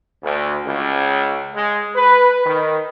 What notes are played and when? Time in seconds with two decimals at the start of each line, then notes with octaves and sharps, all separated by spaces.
0.22 D2
0.65 C#2
1.54 G#3
1.95 B4
2.45 D#3